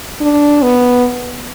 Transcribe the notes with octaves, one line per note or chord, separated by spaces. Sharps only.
D4
B3